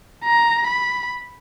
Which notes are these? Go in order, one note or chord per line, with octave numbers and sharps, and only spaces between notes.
A#5
B5